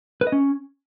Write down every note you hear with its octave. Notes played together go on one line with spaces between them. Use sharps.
B4
D#5
C#4